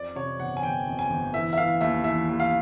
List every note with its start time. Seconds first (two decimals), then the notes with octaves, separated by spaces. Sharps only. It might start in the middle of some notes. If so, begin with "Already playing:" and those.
Already playing: F2 D5
0.16 C3 C#5
0.40 G1 F#5
0.57 G#5
0.63 G1 G5
0.87 F2
0.99 G#5
1.10 G1
1.34 E3 E5
1.53 E5
1.57 E3 F5
1.81 D#2 E5
2.04 E3 E5
2.29 D#2
2.40 F5